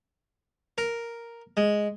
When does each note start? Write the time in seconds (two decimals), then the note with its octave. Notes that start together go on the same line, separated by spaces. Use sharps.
0.78 A#4
1.57 G#3